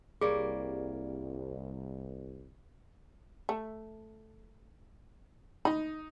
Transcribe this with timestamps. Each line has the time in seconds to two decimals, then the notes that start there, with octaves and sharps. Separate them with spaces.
0.21 C2 G3 A#3 G#4 C#5
3.49 A3
5.65 D#4 D#5 B5